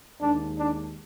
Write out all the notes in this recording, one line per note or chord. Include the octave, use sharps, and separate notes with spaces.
D#2 D#3 G#3 D4
D4